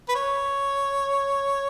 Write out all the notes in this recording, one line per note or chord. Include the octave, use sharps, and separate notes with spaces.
B4
C#5